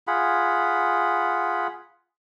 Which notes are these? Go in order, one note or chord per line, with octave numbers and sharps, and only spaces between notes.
F4 G#4 F#5 B5